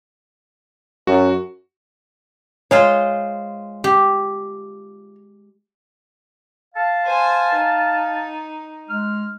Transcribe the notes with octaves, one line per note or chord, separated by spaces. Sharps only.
F#2 F#4
G#3 F4 C5 C#5
G4
F5 A5
C5 G#5
D#4
G#3 F6